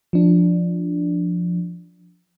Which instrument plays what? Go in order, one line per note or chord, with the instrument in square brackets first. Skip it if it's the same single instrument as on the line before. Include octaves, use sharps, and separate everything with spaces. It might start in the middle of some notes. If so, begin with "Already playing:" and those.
[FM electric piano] F3 D4